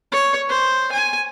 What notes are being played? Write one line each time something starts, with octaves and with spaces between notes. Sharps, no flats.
C#5
C5
G#5